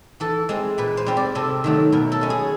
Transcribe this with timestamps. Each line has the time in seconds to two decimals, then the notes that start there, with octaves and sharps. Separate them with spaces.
0.20 E3 A4
0.49 G#3 C4
0.78 A#2 B4
0.97 C5
1.06 G3 C4
1.17 D5
1.35 C3 A4
1.64 D#3 F#3 A3
1.92 B2 A#4
2.12 A4
2.21 G#3 C#4
2.30 G#4